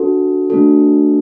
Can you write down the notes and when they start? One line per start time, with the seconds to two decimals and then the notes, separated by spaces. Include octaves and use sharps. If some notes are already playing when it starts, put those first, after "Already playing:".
Already playing: D4 F#4 A4
0.50 A3 D4 F#4 A4